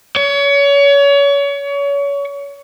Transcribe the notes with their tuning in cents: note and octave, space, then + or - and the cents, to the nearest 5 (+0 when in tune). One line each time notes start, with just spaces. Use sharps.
C#5 +30